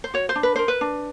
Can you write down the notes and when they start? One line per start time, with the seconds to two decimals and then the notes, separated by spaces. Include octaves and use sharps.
0.04 C5
0.14 F#4 C#5
0.29 C5
0.35 D4
0.43 B4
0.56 A#4 C5
0.68 B4
0.81 D4